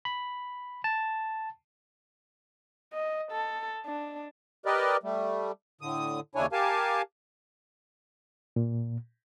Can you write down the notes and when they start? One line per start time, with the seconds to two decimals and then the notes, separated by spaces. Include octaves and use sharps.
0.05 B5
0.84 A5
2.93 D#5
3.31 A4
3.86 D4
4.66 G4 A#4 B4 D5 D#5
5.03 G3 A3
5.81 A2 D3 D#6
6.35 D#2 C#3 D4 E4 C#5 G#5
6.52 G4 A#4 F5 G#5 A5
8.56 A#2